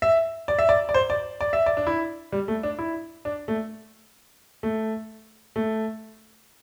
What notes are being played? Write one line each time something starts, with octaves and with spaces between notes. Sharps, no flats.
E5
D5
E5
D5
D5
C5
D5
D5
E5
D5
D4
E4
G3
A3
D4
E4
D4
A3
A3
A3